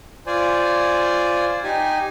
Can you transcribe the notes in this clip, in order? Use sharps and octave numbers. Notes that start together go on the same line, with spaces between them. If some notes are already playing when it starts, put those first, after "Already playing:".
F4 C5 D5 G#5
D#4 G4 G#5